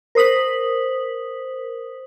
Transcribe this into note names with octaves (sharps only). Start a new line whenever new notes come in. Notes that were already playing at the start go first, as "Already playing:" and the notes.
A#4 C5 D#6 B6 F#7